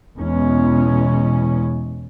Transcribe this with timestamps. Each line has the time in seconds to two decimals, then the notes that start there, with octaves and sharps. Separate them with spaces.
0.18 E2 B2 G#3 C#4